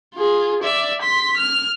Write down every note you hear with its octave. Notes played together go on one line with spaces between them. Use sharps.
F4 G#4
D5 E5
C6 B6
F6